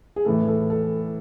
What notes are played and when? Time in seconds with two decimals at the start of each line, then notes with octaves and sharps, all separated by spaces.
0.16 G#4
0.25 A2 E3 A4
0.48 A4
0.70 A4